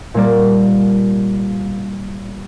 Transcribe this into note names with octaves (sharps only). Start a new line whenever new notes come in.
A#2 G3 A#3 D5